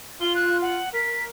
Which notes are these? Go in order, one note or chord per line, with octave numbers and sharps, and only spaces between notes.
F4 G7
F#6
F#5
A#4 B6